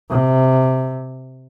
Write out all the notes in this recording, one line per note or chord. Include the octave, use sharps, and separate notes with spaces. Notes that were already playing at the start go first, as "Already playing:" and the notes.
C3